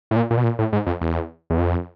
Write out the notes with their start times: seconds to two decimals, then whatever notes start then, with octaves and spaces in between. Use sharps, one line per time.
0.11 A2
0.16 A#2
0.31 A#2
0.37 B2
0.44 A#2
0.59 A2
0.73 G#2
0.87 F2
1.01 E2
1.50 E2
1.58 F2